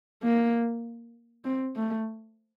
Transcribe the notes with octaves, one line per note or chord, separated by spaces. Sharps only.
A#3
C4
A3